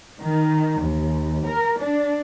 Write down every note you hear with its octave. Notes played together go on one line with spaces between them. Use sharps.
D#3
D#2
A#4
D4